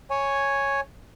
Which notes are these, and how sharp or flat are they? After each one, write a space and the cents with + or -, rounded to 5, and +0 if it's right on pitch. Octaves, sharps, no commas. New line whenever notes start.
C#5 +0 G#5 +0